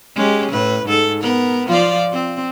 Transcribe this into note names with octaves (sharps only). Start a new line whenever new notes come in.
G#3 C#4 G4
A2 B4
G#2 A4
B3 A#4
F3 F4 D5
C4